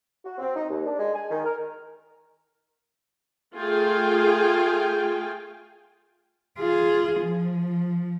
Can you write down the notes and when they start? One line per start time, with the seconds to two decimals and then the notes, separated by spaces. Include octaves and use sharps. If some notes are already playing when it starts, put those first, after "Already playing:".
0.25 F#4
0.38 C4
0.56 D#4
0.69 D#2
0.85 D4
0.98 G#3
1.14 G#5
1.30 D#3
1.45 A#4
3.54 A3 F4 G#4 G5 G#5
6.59 F4 G#4
7.21 F3